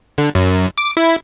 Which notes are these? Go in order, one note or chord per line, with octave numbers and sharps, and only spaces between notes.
D3
F#2
D6
E4